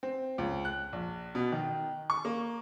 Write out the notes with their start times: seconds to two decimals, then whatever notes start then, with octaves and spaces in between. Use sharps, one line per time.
0.03 C4
0.38 C#2
0.65 F#6
0.93 A#1
1.35 B2
1.52 D#3
2.10 C#6
2.25 A#3